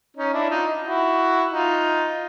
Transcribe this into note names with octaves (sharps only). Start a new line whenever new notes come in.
C#4 D#4
D4 E4
D#4 F4
E4 F#4
D#4 F4